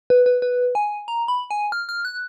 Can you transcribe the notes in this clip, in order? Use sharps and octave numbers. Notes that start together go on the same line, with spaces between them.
B4
B4
B4
G#5
A#5
B5
G#5
F6
F6
F#6